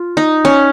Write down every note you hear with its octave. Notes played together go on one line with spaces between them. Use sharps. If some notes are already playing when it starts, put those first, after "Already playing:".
Already playing: F4
D#4
C#4